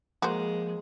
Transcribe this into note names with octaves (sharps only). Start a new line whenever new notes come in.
F3 G#3 A#3 F#4 C5